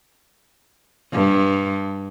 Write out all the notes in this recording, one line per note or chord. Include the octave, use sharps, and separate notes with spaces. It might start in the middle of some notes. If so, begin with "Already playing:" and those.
G2